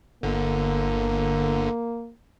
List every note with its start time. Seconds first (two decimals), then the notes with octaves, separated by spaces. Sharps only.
0.23 G1 D3 A#3